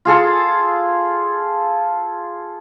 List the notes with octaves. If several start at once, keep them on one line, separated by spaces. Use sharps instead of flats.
F4 G#4 A4